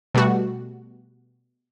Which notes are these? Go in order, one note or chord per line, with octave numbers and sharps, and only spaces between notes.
B2 G3 A3 F#4